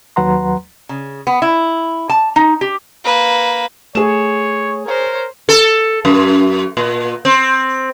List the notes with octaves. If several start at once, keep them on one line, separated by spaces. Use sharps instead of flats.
D#2 F#3 B4 F#5 A#5 C6
C#3
B3
E4
A5
D#4
G4
A#3 B4
A3 G#4 C#5 E7
A#4 C5 C#5
A4
F#2
A#2
C4